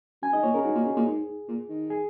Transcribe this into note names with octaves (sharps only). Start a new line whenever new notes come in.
F#2 G#5
G#2 D#5
A#2 C#5
C#3 A#4
G#2 F#4
A#2
C#3 G#4
A#2
G#2
A#2
D#3
G#4